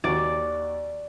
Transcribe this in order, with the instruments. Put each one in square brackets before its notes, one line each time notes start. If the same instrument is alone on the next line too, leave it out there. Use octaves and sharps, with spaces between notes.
[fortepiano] D#2 F#4 [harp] D5